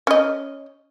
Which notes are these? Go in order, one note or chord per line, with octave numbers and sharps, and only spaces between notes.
C#4 D#5